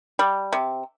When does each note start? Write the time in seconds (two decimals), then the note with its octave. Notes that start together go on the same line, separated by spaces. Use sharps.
0.19 G3
0.53 C3